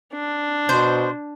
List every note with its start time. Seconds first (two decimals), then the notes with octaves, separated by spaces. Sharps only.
0.14 D4
0.69 B2 C5